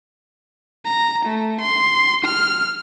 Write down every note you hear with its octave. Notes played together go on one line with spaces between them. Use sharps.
A#5
A3
C6
F6